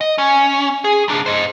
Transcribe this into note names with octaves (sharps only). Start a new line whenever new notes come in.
D#5
C#4
G#4
C2 D4
C5 D#5